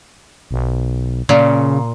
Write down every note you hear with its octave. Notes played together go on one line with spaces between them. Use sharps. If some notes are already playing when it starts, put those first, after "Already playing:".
B1
A#2 C#3